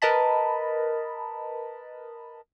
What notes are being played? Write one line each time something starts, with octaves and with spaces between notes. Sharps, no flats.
A#4 B4 D#5 A5 B5